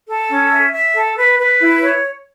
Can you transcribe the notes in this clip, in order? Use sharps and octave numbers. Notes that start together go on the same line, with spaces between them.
A4
C#4
E5
E5
A4
B4
B4
E4
C#5